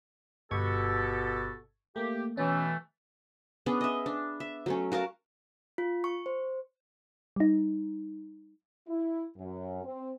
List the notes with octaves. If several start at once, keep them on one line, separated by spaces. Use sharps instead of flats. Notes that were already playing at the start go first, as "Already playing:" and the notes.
G1 B2 G4 A4 C#6 G#6
A3 A#3 G4
B2 E3 A3 C#4
B3 C#4 D4 G#4
D#5 E5
D4
E5
F#3 A3 C#4
F#4 A#4 F5 A5
F4
C#6
C5
G3 D#4
E4
F#2
C4